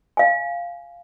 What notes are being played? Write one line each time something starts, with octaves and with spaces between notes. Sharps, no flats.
F5 G#5